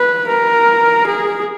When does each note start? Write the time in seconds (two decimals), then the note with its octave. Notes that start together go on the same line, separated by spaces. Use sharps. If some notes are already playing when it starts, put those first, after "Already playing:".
Already playing: B4
0.27 A#4
1.07 G#4